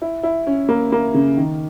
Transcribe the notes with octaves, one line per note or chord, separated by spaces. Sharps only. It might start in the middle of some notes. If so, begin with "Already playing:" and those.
E4
E4
C#4
A#3
A#3
C#3
D#3